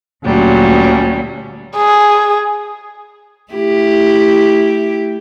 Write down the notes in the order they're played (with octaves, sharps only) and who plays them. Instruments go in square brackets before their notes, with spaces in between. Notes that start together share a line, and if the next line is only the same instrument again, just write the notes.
[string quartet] D2 A#2 F#3 G3 C#4
[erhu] G#4
[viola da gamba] A3 E4 G4